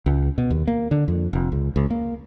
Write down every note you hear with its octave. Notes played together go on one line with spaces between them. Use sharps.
C#2
B2
D#2
A#3
D3
F2
F1
C#2
C#2
A#3